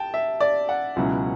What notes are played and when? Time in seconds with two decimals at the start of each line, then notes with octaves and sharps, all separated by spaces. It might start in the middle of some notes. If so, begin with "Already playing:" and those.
Already playing: G5 A5
0.14 E5
0.41 D5
0.69 F#5
0.96 C#2 B2 F#3 C#4 E4